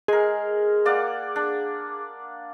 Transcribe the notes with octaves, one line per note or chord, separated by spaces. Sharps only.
G#3 G#4 A#4
A#3 D5 F#5
D4